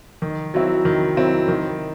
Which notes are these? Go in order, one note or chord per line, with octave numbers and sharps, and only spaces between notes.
D#3
F#3 C4 E4
D#3
F#3 C4 E4
D#3